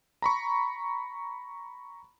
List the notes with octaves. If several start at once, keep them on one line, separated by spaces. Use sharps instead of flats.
A#5 B5 C#6